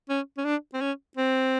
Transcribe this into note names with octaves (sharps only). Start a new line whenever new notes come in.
C#4
C#4
D4
C4
C#4
C4